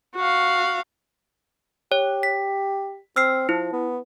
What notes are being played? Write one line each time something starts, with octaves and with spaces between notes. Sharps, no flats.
F#4 F5
G4 C#5
B6
C4 E6 F6 C7
F3 E4
B3